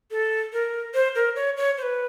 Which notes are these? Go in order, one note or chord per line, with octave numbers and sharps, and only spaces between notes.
A4
A#4
C5
A#4
C#5
C#5
C5
B4